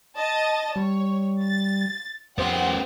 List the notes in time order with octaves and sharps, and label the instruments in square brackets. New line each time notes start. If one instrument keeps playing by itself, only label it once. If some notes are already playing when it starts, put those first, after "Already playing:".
[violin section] D#5 A5 A6
[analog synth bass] G3 [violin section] C#5
[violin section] A6
[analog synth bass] F2 [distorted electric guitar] B3 C5 [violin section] G4 F#5 G5